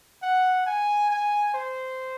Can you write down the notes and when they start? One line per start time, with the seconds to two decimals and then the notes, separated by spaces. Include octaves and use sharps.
0.22 F#5
0.66 G#5
1.10 G#5
1.54 C5